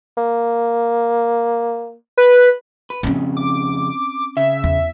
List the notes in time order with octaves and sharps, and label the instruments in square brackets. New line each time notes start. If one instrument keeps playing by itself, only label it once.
[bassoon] A#3
[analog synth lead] B4
[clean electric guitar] B4
[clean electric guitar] F2 C#3 [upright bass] C4 C#4
[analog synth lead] D6
[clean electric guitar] C#3 [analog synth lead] E5
[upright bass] E2